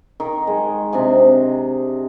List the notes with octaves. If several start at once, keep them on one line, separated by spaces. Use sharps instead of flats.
D#3
G#3
C3 D4 D#5 G#5